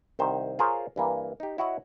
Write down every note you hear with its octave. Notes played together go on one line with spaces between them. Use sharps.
C2 D#3 C5
F4 G#4 A#4 C5 C#5
G2 E3 A#3
D#4 G4
E4 F#4 C#5 D#5 F#5